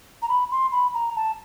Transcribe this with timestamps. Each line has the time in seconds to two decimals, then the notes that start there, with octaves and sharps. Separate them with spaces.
0.22 A#5
0.29 B5
0.51 C6
0.72 B5
0.94 A#5
1.16 A5